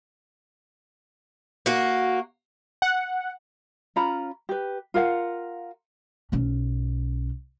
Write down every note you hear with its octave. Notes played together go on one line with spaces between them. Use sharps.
A#3 F#4
F#5
C#4 F4 A#5 B5
G4 B4
F4 A#4 F5 F#5
B1 C#4